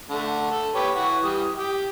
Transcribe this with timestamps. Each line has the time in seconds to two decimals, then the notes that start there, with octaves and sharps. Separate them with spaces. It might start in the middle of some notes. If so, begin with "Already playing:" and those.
0.10 D3 A3
0.51 A4
0.75 G4 B4 C#5
0.95 E3 F#5 C#6
1.24 E3 G3 D#6
1.57 G4 G5